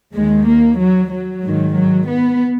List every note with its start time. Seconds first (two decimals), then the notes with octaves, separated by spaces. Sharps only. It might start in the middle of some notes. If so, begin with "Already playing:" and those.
0.14 D#2 D#3 G#3
0.47 A#3
0.78 F#3
1.11 F#3
1.42 G#2 D#3
1.74 F#3
2.06 B3